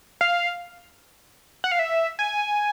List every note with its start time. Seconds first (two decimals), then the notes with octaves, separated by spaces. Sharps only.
0.21 F5
1.64 F#5
1.72 F5
1.79 E5
2.19 G#5